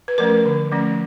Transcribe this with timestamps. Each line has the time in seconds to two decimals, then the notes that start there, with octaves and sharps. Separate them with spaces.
0.08 B4
0.18 F3 A3 C#4 A#4
0.46 D3
0.71 F3 A3 C#4